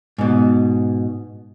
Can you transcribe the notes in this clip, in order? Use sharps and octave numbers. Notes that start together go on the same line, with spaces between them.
G#2 B2